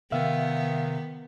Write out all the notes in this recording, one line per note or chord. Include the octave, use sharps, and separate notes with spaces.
C3 D#3 B3 E5 F5